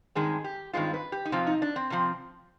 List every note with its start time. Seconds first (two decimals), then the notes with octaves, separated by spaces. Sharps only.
0.15 G2 D#3 G#3 C4 G#4
0.44 G4
0.73 G2 D#3 G#3 C4 F4
0.94 B4
1.12 G4
1.25 D#4
1.32 C3 F3 C4 F4
1.47 D#4
1.62 D4
1.76 C4
1.90 C3 F3 C4